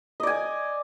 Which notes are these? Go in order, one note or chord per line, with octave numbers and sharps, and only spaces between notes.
D5 D#5 G#5